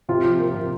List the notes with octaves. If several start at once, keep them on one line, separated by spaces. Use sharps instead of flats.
C3 F4
F3
A#3
C3